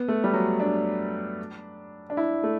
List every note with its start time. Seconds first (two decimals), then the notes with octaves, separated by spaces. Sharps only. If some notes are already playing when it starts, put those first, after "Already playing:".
Already playing: B3
0.08 A3
0.24 G3
0.34 F#3
0.60 D4
2.10 D4
2.17 E4
2.44 A3